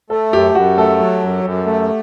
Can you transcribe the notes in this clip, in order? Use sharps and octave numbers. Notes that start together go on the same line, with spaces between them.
A3 A4
F#2 G4
F#2 F#4
A3 A4
F#3
F#2
F#2
A3